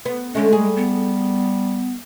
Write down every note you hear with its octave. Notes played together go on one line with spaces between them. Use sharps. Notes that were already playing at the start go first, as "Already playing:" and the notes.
B3
D3 G#3 A3 C#4
G3 G#4
B3